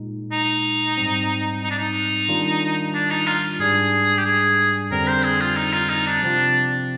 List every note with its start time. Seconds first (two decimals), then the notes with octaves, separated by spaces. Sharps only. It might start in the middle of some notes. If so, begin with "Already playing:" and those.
Already playing: A#2 G#3 D#4
0.32 D#4
0.97 G#2 G3 C4
1.63 D#4
1.70 D4
1.78 D#4
2.29 D#3 G3 D4 F4
2.94 D4
3.11 D#4
3.27 F4
3.59 G#2 G3 D4 G#4
4.18 G4
4.25 G#4
4.91 F2 D3 G3 C4 A#4
5.08 C5
5.23 G#4
5.40 F4
5.57 D#4
5.73 F4
5.89 D#4
6.06 D4
6.22 C3 F3 C4 F4